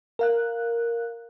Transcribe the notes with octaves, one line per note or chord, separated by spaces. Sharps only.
A#4 F5 F#6